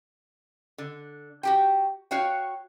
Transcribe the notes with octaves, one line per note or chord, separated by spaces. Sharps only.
D3
F#4 G4 G5
F#4 C#5 F5 G5